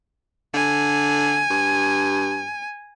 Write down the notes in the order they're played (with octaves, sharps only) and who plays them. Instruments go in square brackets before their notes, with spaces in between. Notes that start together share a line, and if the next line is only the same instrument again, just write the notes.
[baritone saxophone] D3 [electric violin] G#5
[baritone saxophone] G2